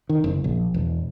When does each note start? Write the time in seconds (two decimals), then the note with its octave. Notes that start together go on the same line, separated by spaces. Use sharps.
0.09 D#3
0.24 F#1
0.44 A#1
0.74 E1